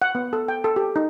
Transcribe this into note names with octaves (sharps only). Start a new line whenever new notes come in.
F#5
B3
A4
G5
A4
G4
D#4